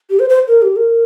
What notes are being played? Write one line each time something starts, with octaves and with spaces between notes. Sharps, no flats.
G4
C5
C5
A#4
G4
A#4